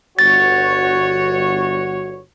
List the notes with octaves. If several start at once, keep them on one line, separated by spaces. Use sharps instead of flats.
G1 F#4 C#5 A6